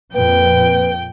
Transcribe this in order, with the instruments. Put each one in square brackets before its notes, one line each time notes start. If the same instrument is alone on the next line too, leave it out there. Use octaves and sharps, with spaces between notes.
[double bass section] F2 A#2 F3 [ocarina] B4 [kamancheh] G5